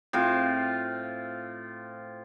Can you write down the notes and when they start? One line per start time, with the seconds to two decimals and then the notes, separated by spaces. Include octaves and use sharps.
0.13 A2 C4 F4